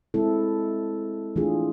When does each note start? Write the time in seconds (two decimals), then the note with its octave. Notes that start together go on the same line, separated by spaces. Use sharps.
0.14 G#3 C4 E4 A4
1.36 E3 A3 D4 F4 G#4